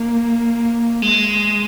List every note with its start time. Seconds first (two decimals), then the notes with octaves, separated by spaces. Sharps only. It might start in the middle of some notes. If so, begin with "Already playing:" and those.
Already playing: A#3
1.02 G#3